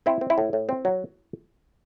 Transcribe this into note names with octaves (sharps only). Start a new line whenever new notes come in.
C4 E4
C4
E4
A2
A2
C4
F#3